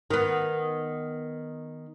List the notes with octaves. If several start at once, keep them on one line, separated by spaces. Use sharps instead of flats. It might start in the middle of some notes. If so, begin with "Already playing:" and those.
D#3 B3